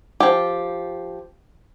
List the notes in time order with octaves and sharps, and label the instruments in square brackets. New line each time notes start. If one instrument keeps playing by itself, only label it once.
[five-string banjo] F3 G4